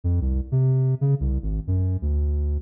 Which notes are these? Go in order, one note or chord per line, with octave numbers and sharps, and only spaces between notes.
F2
C2
C3
C#3
C2
G#1
F#2
D2